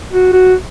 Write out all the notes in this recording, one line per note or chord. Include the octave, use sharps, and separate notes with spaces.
F#4
F#4